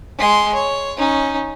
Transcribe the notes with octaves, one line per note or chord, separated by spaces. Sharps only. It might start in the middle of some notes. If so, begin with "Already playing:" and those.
G#3 C6
C#5
C#4 D#4